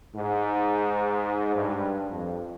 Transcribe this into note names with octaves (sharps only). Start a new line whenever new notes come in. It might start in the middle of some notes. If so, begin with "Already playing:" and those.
G#2
G2
F2